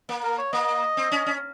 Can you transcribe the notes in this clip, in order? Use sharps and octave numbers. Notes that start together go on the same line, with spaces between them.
A#3
A#4
C#5
A#3 D#5
C4
C#4
C#4